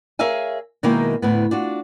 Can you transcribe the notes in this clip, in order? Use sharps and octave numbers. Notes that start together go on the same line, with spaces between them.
G#4 A#4 C#5 E5 F5 G#5
B2 D#3 G#3 A#3 E4 G5
D2 A2 B3
D4 F4 F#4